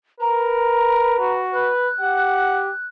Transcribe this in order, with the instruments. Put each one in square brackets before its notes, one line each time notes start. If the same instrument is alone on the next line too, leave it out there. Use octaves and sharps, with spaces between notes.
[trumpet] A#4 [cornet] B4 [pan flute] A#5
[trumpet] F#4
[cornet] B4 [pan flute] F#6
[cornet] G4 [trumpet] F#5